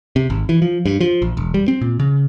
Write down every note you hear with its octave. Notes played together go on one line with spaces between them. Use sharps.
C3
G#1
E3
F3
G2
F3
A#1
E1
G3
C4
A#2
C#3